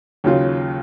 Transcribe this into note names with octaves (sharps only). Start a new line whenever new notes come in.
D#2 C#3 F#3 C#4 F4